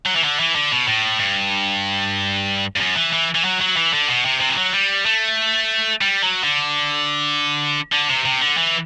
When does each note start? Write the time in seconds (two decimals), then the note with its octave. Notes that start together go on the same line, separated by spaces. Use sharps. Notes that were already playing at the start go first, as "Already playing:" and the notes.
0.06 F#3
0.15 E3
0.24 D3
0.39 E3
0.55 D3
0.72 B2
0.88 A2
1.19 G2
2.76 G2
2.80 F#2
2.96 E3
3.13 E3
3.35 E3
3.44 F#3
3.61 F#3
3.76 E3
3.93 D3
4.08 B2
4.25 C3
4.41 C3
4.50 E3
4.57 F#3
4.73 G3
5.06 A3
6.01 G3
6.23 F#3
6.44 D3
7.93 D3
8.10 C3
8.25 C3
8.41 D3
8.57 E3